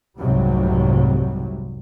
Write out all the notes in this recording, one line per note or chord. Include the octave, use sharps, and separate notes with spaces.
F1 C2 G#2 C3 F#3 G3